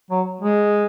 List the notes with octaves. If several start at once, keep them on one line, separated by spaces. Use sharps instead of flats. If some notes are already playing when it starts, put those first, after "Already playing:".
F#3
G#3